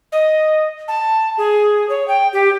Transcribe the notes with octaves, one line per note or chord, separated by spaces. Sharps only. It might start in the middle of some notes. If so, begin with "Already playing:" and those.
D#5
A5
G#4
C#5
G5
G4